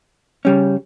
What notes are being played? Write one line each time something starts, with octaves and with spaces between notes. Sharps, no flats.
C#3 G3 C#4